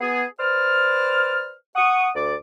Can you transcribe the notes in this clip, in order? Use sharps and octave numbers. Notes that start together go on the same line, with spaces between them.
B3 G#4
B4 C5 D5 F6
F#5 C#6 D#6
D2 D5 D6